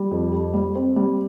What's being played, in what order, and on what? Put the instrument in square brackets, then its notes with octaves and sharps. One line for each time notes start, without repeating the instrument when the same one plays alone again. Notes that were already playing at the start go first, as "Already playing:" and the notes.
Already playing: [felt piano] G3
F2
G4
G3
C4
G3